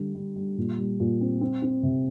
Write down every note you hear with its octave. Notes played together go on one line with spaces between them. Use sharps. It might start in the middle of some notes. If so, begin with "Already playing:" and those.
Already playing: D3 G3
G3
G3
A#2
G3
A#2
C4
C4
C4
C3